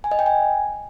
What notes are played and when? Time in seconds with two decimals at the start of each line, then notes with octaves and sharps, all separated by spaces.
0.04 G#5
0.11 D#5
0.19 G5
0.26 G#5